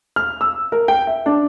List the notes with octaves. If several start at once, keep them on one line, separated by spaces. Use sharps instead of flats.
F6
E6
A#4
G5
E5
D4